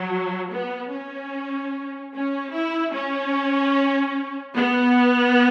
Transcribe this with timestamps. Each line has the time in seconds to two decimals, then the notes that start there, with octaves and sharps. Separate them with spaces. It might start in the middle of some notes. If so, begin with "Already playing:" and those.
Already playing: F#3
0.52 B3
0.93 C#4
2.14 C#4
2.54 E4
2.94 C#4
4.55 B3